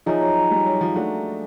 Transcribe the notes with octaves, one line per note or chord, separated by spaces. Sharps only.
F3 D#4 G#4 C#5 E5
F#3
F#3
G3
F#3
F3
A3 A#3 D4 F#4